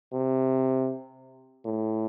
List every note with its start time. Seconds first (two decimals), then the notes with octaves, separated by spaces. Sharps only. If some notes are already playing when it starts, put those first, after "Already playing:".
0.14 C3
1.65 A2